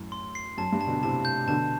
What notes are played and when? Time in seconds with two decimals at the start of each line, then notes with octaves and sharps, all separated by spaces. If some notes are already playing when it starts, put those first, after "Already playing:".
Already playing: F#2 A2
0.12 C6
0.35 C7
0.57 F#2 A5
0.72 G2
0.81 A5
0.87 B2 D3
1.02 A2 C3 A5
1.25 G6
1.47 B2 D3 A5